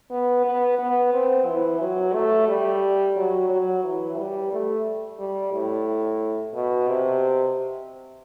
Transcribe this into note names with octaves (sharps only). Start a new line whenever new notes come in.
B3
B3
B3
C4
E3
F#3
A3
G3
F#3
F#3
E3
G3
A3
G3
A2
B2
C3